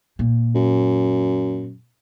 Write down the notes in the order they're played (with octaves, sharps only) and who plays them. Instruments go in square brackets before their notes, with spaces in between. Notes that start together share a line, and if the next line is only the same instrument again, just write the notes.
[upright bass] A#2
[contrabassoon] F#2